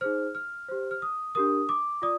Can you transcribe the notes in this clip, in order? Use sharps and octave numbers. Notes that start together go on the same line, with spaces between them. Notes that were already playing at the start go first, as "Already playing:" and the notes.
D#4 G#4 C5 F6
F6
G4 C5
F6
D#6
D4 G4 A#4 D#6
D6
F4 D5 D#6